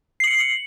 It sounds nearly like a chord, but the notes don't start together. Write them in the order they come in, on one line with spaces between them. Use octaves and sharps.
C7 F#7 C#7